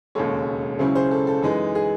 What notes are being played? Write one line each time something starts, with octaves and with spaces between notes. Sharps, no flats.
E1 D#2 C#3 G#3 A4 C#5
C#2 C#3 F#3 C#4 E4 G#4 C5
G#4 C5
A4
A4
F#2 E3 G#3 D#4
G#4